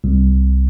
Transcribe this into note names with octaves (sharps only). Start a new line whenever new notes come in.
C2